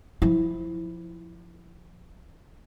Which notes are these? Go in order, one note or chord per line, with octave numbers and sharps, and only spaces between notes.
F3 E4